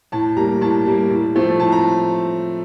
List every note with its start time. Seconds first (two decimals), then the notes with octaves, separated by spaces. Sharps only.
0.12 A2 A5
0.36 G3 A#3 A#5
0.61 A2 A5
0.86 G3 A#3
1.10 A2
1.35 F3 A3 C4
1.60 A2 A5
1.72 A#5